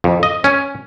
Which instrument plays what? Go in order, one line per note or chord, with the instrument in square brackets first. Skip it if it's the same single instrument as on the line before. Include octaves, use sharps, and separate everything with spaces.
[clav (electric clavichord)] F2
D#5
C#4